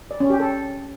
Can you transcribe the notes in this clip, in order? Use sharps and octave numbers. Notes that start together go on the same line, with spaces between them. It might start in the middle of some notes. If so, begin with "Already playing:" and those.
D5
C#4
G4
A4